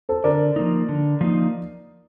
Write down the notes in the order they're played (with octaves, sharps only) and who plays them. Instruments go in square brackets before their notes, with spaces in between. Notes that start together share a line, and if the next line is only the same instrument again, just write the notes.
[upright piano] A4 C5
[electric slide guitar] D3 [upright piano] A#4 D5
[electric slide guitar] F3 A#3 D#4
D3
F3 A#3 D#4